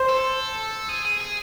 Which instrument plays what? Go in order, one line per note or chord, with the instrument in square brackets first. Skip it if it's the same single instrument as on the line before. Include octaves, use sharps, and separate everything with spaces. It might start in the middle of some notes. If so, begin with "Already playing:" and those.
Already playing: [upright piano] C5
[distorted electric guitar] A4
G#4
G#4
G#4